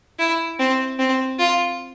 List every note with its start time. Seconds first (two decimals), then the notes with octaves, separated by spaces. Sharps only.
0.19 E4
0.59 C4
0.99 C4
1.39 F4